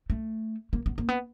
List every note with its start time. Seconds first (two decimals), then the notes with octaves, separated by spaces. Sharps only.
0.10 A3
0.73 A#3
0.86 B3
0.98 A#3
1.09 B3